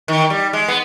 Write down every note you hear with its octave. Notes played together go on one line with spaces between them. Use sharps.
D#3
G3
G#3
B3